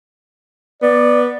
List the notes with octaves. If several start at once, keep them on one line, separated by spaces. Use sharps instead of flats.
B3 D5